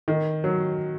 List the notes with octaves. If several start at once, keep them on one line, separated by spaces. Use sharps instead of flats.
D#3
F#3